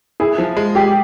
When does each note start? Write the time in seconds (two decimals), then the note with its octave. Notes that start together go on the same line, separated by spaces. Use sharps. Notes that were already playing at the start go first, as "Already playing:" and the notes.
0.20 E4 G#4
0.38 F3
0.57 G#3
0.75 G4 G#4